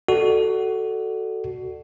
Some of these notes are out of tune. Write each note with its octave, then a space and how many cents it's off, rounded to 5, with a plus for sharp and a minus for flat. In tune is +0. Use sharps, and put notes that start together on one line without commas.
F#4 +15 A4 +0 D5 +20